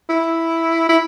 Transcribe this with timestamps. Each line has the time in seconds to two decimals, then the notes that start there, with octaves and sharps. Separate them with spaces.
0.09 E4
0.89 E4